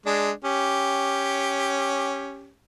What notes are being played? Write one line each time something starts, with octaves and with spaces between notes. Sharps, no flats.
G#3 D4
C#4 G4